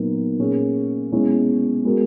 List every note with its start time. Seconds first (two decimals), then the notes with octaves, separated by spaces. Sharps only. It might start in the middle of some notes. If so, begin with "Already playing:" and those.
Already playing: A#2 F#3 B3 D#4 A#4
0.39 A#2 A#3 C#4 G#4
1.12 B2 G#3 C#4 E4
1.85 G#3 B3 F#4 A#4